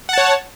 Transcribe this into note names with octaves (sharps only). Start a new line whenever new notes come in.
C#5 F#5 A5